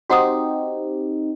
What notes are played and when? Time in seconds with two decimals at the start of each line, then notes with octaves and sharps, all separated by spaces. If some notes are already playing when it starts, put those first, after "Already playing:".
0.10 C4 D#4 F#4 G4 F#5 D#6